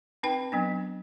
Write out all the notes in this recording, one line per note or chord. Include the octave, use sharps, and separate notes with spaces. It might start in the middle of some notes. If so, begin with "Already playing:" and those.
C4 D#4 B4 G5
F#3 B3 D4